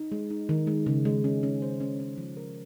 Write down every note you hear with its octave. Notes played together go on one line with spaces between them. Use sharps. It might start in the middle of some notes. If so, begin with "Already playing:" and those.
Already playing: D#4
G#3
D#4
D#3
G#3
C#3
G#3
C#4
C#4
C5
C#4
C#4
F3
A#4